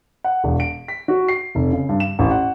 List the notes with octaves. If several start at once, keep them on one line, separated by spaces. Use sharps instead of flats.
F#5
E1
D7
B6
F#4
C7
F1
C#3
G2
E7
A1
F#5